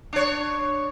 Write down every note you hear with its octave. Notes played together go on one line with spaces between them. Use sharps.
D4 C#5